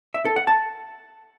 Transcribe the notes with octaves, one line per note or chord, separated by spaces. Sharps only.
E5
A4
F#5
A5